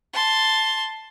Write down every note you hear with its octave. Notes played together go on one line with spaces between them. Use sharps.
A5 C6